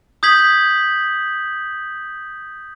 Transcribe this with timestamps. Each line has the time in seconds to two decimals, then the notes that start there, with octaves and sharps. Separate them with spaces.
0.23 D#6 G6 G#6 B6 F#7